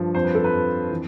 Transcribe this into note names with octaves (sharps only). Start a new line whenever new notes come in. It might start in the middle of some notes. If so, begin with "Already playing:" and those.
Already playing: G2 F3
F2 C5
B4
A4
B4
F2
E3